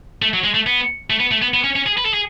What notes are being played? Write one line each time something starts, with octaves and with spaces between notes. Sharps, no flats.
A3
F#3
G#3
A3
B3
A3
B3
A3
B3
B3
C#4
C#4
G#4
B4
A4
G#4